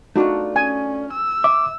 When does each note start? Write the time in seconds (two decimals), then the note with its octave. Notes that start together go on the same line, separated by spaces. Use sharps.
0.16 A3 D4 D#4 F4 F#4
0.56 C#4 G#5
1.13 E6
1.44 E5 D6